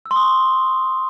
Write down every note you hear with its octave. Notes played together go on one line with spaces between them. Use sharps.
E6
C6
D#6
C#6